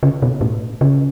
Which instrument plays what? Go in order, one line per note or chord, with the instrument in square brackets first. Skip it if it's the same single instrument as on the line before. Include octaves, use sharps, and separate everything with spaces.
[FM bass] C#3
B2
A2
C#3